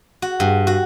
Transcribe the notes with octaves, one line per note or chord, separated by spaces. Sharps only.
F#4
G2
F#4